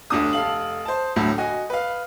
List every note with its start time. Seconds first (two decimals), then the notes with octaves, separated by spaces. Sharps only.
0.10 G1 D2 D4 D#6
0.33 F1 A4 F5 F#7
0.85 C5 A5
1.16 D2 A2 F#3 A3
1.38 F#4 D#5 G#5
1.70 B4 F5